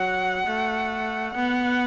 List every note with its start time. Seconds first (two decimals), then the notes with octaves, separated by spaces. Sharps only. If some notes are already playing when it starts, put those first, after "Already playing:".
Already playing: F#3 F#5
0.47 A3
1.36 B3 F#5